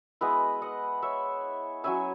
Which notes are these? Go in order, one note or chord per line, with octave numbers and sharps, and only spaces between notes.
G#3 B3 E4 B4 D#5
D#5 F#5
C#5 E5
F#3 C#4 E4 E5 G#5